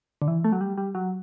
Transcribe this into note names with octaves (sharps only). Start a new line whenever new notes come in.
D3
E3
A3
F#3
G3
G3
F#3